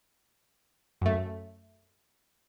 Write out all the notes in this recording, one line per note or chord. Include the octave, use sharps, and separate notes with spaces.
F#2 A3